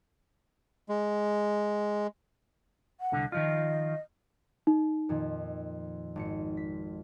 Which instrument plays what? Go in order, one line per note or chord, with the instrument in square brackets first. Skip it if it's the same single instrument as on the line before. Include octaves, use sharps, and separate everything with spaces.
[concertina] G#3
[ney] F#5
[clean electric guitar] C2 D3
[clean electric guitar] D#3 F3 F4 [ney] D#5
[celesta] D#4
[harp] F2 A#2 D#3
G#1 C#7
B6